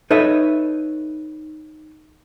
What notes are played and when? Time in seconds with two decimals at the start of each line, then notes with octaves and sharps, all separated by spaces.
0.11 D#4 A4 B4 C#5 D#5 E5